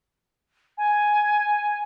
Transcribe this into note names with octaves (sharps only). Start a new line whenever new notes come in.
G#5